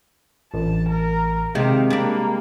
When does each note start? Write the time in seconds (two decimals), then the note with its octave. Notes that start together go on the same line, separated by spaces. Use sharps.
0.54 A1 A5
0.89 A#4
1.55 C3 D#3 G#3 G4 F5
1.90 G3 A#3 D4